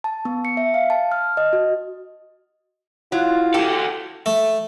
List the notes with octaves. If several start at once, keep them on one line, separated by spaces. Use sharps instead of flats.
A5
B3
C#7
E5
F5
A5
F6
D#5
F#4
F#3 E4 F4
F#4 G4 A4
A3